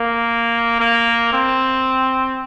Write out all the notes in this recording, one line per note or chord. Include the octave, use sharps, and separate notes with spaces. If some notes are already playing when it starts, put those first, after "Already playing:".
Already playing: A#3
A#3
C4